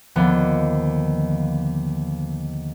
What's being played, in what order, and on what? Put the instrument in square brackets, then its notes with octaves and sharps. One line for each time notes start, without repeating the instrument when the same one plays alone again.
[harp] D#2 D3 F3 B3